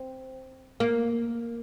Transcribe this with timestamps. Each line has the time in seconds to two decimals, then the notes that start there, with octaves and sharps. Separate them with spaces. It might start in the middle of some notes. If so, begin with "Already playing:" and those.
Already playing: C4
0.80 A#3